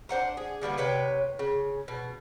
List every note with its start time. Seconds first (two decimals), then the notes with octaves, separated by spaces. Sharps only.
0.09 D4 C5 F#5 A#5
0.37 G#4
0.62 D3 G3 A#3 B3
0.78 C3 B4 C#5 G5
1.39 C#3
1.88 B2